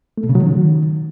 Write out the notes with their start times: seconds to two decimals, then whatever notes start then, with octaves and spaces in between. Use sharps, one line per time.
0.18 A3
0.23 B2
0.29 C#3
0.35 F#3
0.41 D#3